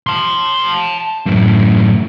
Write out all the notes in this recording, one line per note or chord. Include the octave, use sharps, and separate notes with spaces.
A5 C6
F#2 A2